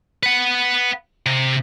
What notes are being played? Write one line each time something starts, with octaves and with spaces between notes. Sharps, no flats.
B4 F#5
C3